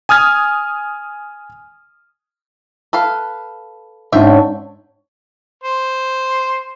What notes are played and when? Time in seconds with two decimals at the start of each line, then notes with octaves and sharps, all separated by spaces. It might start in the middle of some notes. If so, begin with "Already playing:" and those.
0.09 G#5 D#6 F6 G#6
2.93 A4 B4 F5
4.12 G#2 C#4 D4 F4 E5 G5
5.63 C5